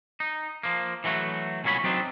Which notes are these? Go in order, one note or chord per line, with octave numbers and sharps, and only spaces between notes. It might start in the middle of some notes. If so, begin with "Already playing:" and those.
D#4
F3 A#3
E3 F#3 A3 F#4
C2 A#2 F#3 C#4 C#5 B5
F#3 C4 D4 D#4